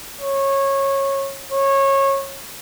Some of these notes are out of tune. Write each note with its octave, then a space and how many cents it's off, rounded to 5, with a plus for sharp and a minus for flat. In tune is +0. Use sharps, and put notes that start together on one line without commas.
C#5 -20
C#5 -20